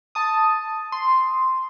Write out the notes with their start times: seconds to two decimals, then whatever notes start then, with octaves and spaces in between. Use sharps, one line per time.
0.15 A5 D#6
0.92 C6